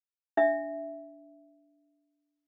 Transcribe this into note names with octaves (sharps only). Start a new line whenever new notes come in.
D4 E5